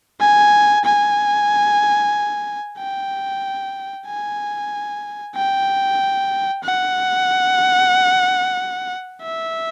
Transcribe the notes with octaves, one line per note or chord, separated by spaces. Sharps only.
G#5
G#5
G5
G#5
G5
F#5
E5